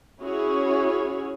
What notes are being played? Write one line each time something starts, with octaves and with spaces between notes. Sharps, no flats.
C#4 E4 F#4 G#4 C#5